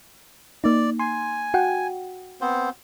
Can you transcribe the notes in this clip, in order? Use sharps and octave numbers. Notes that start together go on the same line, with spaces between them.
A#3 D#4 D5
G#5 C6
F#4 F#5 G5
B3 C4 C5